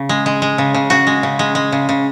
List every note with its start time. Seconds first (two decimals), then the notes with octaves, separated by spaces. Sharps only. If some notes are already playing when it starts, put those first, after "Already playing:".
Already playing: C#3
0.09 G#3
0.26 G#3
0.42 G#3
0.58 C#3
0.74 C#3
0.90 C#3 F#4
1.07 G#3
1.23 C#3
1.39 G#3
1.55 G#3
1.72 C#3
1.89 C#3